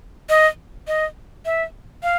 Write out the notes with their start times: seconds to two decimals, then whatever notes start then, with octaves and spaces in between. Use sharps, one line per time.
0.29 D#5
0.88 D#5
1.45 E5
2.03 F5